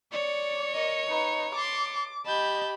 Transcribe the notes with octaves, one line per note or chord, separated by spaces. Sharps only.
C#5 D5 C#7
A#4 D#5
D#4 B4
A5 C6 D6
G4 D#5 A5 B5 G6